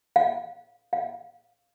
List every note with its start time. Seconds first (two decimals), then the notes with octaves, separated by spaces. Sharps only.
0.16 F5
0.93 F5